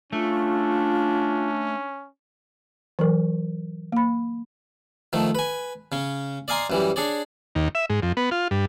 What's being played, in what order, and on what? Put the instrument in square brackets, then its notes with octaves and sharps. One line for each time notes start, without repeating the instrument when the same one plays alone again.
[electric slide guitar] A3 [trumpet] C#4 [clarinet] D4 [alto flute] F4
[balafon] E3 F#3 A#4
A#3 B5
[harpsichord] D#3 F3 A3
B4 G#5
C#3 C#4
D5 D#5 F5 G#5 A#5 C6
F#2 E3 G3
D4 G#4 C#5 D5
[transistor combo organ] D#2
E5
G#2
F2
B3
F4
G2